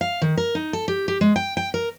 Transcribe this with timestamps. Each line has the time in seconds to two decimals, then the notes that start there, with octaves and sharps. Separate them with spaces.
0.01 F5
0.22 D#3
0.37 A#4
0.55 D#4
0.73 A4
0.88 G4
1.08 G4
1.21 G#3
1.36 G5
1.57 G5
1.74 A#4